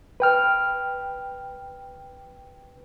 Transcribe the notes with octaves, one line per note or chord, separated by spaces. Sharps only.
B4 G5 F6